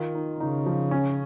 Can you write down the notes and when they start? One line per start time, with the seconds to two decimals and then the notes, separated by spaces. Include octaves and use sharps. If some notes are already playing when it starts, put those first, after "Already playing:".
Already playing: D#3 F4
0.15 D#4
0.40 C#3 D#4
0.66 F3
0.91 C#4